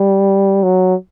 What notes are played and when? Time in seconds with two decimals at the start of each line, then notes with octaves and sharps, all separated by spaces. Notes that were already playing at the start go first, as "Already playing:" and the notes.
Already playing: G3
0.63 F#3